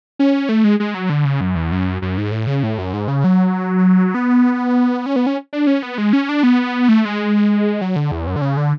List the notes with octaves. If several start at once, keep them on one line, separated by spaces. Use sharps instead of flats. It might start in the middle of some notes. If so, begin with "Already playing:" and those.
C#4
A3
G#3
G#3
F#3
D3
C#3
F#2
E2
F#2
F#2
G#2
A2
C#3
A2
F#2
G#2
C#3
F#3
B3
C#4
B3
C#4
D4
C#4
B3
G#3
C#4
D4
B3
A3
G#3
F#3
D3
E2
F#2
D3
C#3
D3